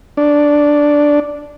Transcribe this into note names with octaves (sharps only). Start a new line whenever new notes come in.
D4